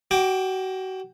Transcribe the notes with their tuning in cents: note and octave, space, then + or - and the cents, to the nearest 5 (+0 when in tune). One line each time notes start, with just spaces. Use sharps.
F#4 +30 G5 +20 D6 +0